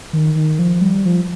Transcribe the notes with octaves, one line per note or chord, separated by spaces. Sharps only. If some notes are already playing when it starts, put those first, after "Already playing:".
D#3
D#3
F3
G3
F3